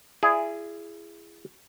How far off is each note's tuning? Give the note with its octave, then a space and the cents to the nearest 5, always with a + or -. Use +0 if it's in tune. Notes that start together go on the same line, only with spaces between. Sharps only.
E4 +30 G#4 +0 D5 +25